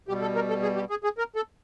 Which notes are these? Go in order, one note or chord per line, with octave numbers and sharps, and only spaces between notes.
B2 G3 G4
A4
A#4
A4
G#4
G4
G#4
G#4
A#4
A4